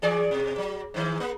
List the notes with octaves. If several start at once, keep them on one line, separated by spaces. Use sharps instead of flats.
E3 G#4 D5
B2
F#3
G#2 D#3
A#3